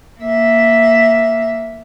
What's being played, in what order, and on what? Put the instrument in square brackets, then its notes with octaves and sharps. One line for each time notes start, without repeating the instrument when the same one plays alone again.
[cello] A#3 E5